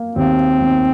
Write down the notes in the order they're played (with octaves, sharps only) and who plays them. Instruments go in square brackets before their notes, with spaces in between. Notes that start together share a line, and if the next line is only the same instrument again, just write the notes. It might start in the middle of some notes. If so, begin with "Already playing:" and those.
Already playing: [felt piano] A#3
[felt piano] D#2 [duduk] C4
[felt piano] D#3